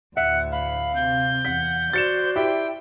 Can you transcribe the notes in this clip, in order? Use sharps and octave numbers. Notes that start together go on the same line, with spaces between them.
D2 A2 E5 F#5
F5 B5
C3 G6
E2 F#5 B6
F#4 C5 D5 A6 C#7 E7
E4 G4 G5